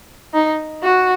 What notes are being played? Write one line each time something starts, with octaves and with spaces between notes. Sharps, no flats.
D#4
F#4